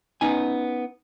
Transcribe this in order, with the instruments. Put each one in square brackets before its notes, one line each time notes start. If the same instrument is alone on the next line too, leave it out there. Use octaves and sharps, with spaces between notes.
[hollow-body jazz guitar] B3 C#4 D#4 G#5